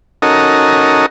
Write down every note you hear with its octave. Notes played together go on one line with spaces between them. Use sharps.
C#4 D#4 F#4 A4 A#4 D#5